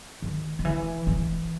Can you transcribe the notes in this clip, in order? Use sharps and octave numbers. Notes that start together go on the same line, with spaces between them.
D#3
D#3
E3
E3